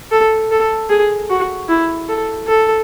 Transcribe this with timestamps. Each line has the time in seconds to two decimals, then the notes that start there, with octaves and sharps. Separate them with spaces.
0.11 A4
0.51 A4
0.90 G#4
1.30 F#4
1.69 E4
2.08 A4
2.47 A4